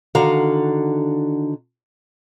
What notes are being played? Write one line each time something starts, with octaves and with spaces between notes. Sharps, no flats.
D3 D#3 D4 F#4 F5 A#5